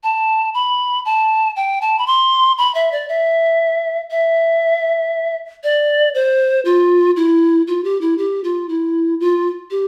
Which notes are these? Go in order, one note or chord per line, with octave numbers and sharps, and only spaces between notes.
A5
B5
A5
G5
A5
B5
C6
B5
E5
D5
E5
E5
D5
C5
F4
E4
F4
G4
E4
G4
F4
E4
F4
G4